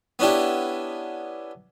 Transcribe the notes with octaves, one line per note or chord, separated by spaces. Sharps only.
B3 C#4 D4 E4 G4